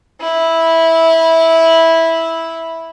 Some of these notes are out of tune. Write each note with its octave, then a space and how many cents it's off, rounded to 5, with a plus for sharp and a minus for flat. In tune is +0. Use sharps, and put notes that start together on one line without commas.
E4 -10